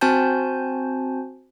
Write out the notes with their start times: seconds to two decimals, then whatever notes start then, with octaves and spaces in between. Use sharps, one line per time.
0.01 C4 F#4 C5 G#5 A5 G6